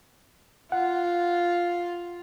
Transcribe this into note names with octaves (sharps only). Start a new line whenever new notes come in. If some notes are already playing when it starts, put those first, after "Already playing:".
F4 F#5